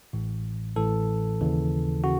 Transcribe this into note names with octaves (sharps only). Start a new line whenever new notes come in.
A1 A2 E3
A1 A2 E3 A4
D#2 C#3 E3
C#3 F#4